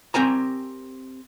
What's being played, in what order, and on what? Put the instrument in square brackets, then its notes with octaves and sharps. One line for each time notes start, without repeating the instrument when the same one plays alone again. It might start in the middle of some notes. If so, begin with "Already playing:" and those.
[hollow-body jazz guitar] C4 G4 A#4 G#5 A#5